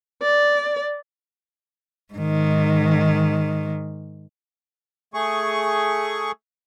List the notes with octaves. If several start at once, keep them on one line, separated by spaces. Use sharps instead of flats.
D5
G#2 D#3
A3 G#4 C#6